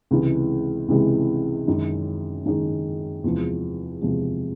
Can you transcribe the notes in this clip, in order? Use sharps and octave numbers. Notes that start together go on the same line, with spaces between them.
C#2 C3 E3 G#3
C#2 C3 E3 G#3
F#2 D#3 G#3
F#2 D#3 G#3
E2 C3 F3 G#3
E2 C3 F3 G#3